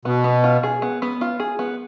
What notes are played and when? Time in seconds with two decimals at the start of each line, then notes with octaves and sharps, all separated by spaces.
0.05 B2 B3
0.24 B3
0.44 F4
0.63 G#4
0.82 B3
1.02 B3
1.21 F4
1.40 G#4
1.59 B3